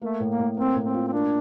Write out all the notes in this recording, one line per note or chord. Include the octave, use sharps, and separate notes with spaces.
A3 A#3
A2
A#3
A2
A#3 C4
A2
C4
F4
C4
A#3 D4